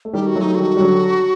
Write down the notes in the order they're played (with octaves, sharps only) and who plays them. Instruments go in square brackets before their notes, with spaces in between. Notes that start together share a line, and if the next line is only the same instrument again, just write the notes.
[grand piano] A3
[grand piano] D#3 G3 [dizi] G4
[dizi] F#4
[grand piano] F#3 A3
[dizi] D#4
[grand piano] D#3 G3 [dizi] F#4
[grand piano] G3
D3 F#3